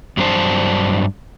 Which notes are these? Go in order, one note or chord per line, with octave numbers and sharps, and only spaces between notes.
G2 F#3 A#3 D4 C5 A5